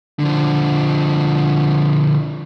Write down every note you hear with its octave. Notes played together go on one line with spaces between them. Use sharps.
D3 F3